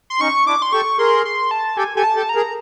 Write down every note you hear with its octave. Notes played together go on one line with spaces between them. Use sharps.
C6
C#4 D#4 C#6
D4 E4 D6
C6
G4 A4 C#6
G#4 A#4 C6
C6
A5
G4 A4 G#5
G4 A4 G#5
A5
G4 A4
A#5
G#4 A#4